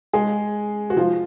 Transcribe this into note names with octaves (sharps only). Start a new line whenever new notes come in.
G#3 G#4
F#4
F3 F4